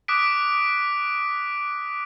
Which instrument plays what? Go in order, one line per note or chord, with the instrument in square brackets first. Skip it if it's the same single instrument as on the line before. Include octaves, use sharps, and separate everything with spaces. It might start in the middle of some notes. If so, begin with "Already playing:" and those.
[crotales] D6 D#6 F#6 B6 D7